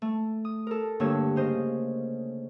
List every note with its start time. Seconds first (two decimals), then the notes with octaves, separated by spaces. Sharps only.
0.02 A3
0.45 D#6
0.67 A4 A#4
1.00 G2 D3 A3 A#3 C#5 E6
1.36 C#3 C5 D#5